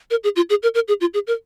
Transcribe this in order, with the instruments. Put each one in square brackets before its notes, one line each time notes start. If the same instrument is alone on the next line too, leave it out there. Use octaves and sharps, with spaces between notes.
[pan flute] A#4
G#4
F4
G#4
A#4
A#4
G#4
F4
G#4
A#4